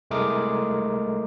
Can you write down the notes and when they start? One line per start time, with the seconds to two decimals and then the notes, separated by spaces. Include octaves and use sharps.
0.11 C2 G#3 A3 A#4 D6 D#6